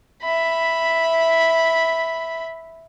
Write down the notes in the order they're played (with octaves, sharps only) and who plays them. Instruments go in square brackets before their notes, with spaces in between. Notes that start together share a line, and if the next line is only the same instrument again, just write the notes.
[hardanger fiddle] E5 B5